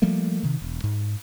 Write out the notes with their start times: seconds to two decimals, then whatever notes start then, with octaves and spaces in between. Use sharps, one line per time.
0.02 F3 G3 A3 A#3
0.43 C3 D#3
0.62 E1
0.84 G#2